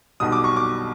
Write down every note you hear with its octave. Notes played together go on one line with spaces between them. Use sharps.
B1 B2 G3 D#6
D6
C#6
D6